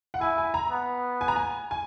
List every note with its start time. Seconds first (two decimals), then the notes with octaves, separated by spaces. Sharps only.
0.14 F#5
0.21 E4 G#5
0.38 G#5
0.54 A#5
0.71 B3
1.21 G#5
1.28 A#5
1.36 G#5
1.71 G#5